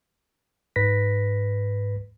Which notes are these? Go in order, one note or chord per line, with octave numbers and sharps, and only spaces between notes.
G#2 B4 A#6 B6